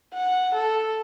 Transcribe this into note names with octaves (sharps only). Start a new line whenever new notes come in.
F#5
A4